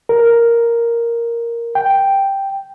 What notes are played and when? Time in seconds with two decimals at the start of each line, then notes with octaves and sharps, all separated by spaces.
0.09 A#4
1.75 G5